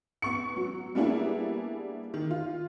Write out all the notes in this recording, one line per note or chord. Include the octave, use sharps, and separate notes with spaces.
B3 C#6 C#7
F#3
G3 A#3 B3 D4 E4 G#4
D#3
F4